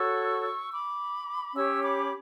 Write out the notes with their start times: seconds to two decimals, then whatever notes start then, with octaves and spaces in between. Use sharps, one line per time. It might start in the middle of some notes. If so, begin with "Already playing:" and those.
Already playing: F#4 A4 C#5 C#6 E6
0.72 B5 D6
1.55 C#4 G4 C#5 C#6 E6
1.82 B5 D6